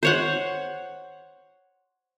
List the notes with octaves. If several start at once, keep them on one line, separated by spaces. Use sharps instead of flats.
C5 C#5 F#5